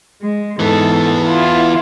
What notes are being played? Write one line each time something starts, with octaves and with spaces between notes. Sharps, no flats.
G#3
G#2 E3 B3 A4
E4 F4